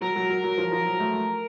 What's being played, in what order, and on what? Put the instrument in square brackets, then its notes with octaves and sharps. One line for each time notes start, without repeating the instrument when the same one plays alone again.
[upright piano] F#3 [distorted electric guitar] A#4
[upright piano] F#3
F#3
F#3
F3
F3
F#3
A3